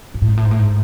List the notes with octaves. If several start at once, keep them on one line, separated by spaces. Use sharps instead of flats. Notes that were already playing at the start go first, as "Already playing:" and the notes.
G#2
A2
G#2
A2
G#2
A2
G#2